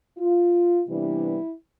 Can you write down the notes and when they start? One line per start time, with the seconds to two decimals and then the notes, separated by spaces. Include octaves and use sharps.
0.18 F4
0.88 C3 E3 G3 B3 D4 E4